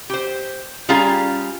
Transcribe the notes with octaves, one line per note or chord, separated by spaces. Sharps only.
G4 C5
G3 C#4 F4 G#4 F5 A#5